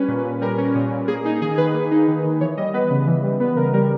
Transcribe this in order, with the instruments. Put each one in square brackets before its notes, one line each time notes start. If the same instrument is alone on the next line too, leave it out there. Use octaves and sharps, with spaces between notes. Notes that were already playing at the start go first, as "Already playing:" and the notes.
Already playing: [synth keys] G3 C#4 B4
A#2
A#2
G3 A#4
C#4
A#2
A#2
A#3 G#4
D#4 G#4
D#3 G#4
D#3 B4
A#3
D#4
D#3
D#3
E3 C#5
G3 D#5
B3 B4
C#3
E3
G3
B3 B4
C#3 A#4
G3 A#4